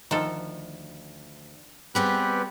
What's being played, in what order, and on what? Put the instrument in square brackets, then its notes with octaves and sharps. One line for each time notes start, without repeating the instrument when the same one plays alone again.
[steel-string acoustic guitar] D2 [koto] D#3 F3 A4
[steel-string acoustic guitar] G3 B3 G#4 [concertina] C4 G4 B4